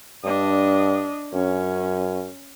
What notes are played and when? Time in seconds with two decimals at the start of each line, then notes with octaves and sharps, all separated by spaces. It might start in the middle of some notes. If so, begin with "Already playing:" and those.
0.24 G2 D4 D#5
1.33 F#2 C#4